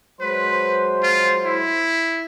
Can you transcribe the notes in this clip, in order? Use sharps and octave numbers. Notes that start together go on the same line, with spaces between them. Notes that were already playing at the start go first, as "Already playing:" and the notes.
F#3 G#3 B4 C5
F4
E4